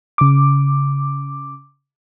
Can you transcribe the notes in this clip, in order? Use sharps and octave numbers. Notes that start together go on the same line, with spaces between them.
C#3 D6